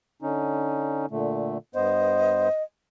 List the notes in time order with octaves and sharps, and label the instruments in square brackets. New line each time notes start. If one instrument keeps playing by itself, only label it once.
[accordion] D3 C#4 D#4
A#2 D3 A3
[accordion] G2 B3 C5 [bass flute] D#5